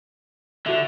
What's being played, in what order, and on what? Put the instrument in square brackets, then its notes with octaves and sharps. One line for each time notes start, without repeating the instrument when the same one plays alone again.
[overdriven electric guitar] D3 [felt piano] F#4 E5